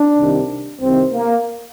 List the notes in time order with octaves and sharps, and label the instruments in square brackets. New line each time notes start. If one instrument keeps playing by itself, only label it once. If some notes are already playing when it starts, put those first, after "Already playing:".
Already playing: [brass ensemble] D4
C2 C3 D#3
C2 C3 D#3 C4
A#3